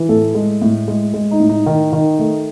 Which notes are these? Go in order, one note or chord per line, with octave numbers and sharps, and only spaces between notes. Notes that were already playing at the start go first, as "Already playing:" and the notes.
Already playing: E3
A2 A4
G#3
A2
G#3
G#3
D#4
A2
D#4
D#3
D#3
A3